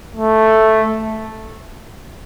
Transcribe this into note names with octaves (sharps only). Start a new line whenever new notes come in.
A3